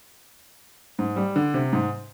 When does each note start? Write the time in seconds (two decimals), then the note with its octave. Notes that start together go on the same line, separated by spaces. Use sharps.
0.99 G#2
1.16 G3
1.36 D3
1.54 C3
1.73 G#2